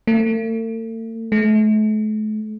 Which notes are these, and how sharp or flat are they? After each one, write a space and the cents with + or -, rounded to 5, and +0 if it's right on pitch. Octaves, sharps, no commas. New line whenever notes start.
A3 +45
A3 -40